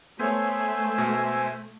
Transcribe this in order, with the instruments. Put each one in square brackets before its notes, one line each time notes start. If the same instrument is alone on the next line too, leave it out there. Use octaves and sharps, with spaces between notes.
[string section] A3 [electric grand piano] B3 C#5 [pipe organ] C5 E5 G#5
[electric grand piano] B2